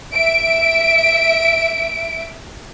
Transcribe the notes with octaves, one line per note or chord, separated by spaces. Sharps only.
E5 D7